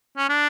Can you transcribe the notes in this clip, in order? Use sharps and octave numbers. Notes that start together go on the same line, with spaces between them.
C#4
D4